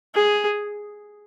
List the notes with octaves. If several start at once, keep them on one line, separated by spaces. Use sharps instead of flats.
G#4